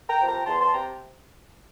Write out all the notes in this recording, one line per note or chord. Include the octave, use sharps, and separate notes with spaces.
G5 A#5
C3 F3
G5 A#5
E2 A5 C6
A5 C6
C3 G5 A#5